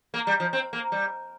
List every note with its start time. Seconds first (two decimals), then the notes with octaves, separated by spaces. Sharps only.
0.14 A#3
0.27 G3
0.40 F3
0.53 C4
0.73 A#3
0.92 G3